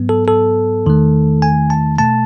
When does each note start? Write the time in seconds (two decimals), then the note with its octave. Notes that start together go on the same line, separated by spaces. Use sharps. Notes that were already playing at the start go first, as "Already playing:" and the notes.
Already playing: G#2 F#3 B3
0.09 A4
0.28 A4
0.86 E2 D#3 A3
1.42 G#5
1.70 A5
1.98 B2 A3 A5